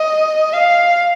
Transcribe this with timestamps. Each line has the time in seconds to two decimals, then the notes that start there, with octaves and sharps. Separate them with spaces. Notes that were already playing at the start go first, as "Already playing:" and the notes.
Already playing: D#5
0.53 F5